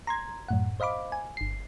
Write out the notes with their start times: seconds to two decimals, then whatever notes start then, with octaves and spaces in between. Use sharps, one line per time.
0.07 A#5 C6 G#6
0.49 F#2 A2 F#5
0.80 C5 D#5 F5 B5 D6
1.12 G#5
1.37 G1 C7